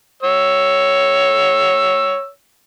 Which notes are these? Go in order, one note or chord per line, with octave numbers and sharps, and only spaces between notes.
C#5 E6